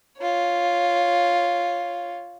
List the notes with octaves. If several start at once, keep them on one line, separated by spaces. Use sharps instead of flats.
F4 C#5